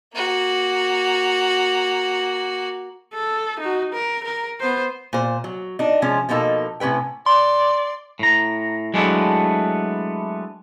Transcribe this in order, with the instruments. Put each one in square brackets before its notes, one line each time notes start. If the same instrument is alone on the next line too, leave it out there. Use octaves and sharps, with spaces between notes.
[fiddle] A#3 F#4
[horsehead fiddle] A4
D#4 F#4
A#4
A#4
B3 C5
[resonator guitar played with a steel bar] A#2 C5
F#3
D4 D#4
C3 F3 G#3 C#4
B2 F3 A#3 D#4 A4
A2 C3 C#4 B4 G5
[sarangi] D5 [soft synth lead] C6
[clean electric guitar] A2 A#5
F#3 G#3 A3 B3 D4 E4